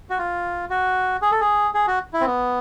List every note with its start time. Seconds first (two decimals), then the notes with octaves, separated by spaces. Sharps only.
0.10 F#4
0.18 F4
0.70 F#4
1.22 G#4
1.31 A4
1.40 G#4
1.74 G#4
1.87 F#4
2.13 E4
2.21 C4
2.26 B3